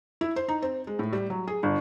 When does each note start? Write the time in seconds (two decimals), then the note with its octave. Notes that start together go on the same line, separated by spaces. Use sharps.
0.21 E4
0.36 C5
0.48 D#4
0.62 C4
0.87 G#3
0.99 A2
1.13 G3
1.30 F#3
1.48 G#4
1.63 G1